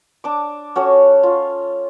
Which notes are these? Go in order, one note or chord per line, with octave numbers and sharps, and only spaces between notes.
D4 D6
C#4 F#4 A4 C#5
F4